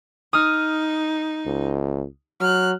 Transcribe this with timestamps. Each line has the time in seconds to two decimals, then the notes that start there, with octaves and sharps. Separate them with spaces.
0.33 D#4 D#6 F6
1.46 C#2
2.41 F#3 F6 F#6